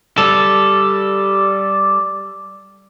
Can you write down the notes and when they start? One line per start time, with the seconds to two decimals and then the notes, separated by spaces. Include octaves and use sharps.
0.18 G3 A4